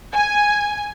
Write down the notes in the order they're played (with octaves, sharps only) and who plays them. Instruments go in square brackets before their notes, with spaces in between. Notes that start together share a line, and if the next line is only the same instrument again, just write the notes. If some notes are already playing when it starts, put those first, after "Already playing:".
[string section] G#5